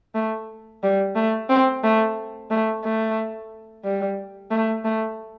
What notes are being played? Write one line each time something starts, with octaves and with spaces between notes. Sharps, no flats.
A3
G3
A3
C4
A3
A3
A3
G3
A3
A3